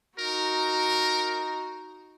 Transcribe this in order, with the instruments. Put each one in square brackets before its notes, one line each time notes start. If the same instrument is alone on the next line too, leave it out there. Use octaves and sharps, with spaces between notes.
[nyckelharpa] D#4 F#4 [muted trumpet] A#4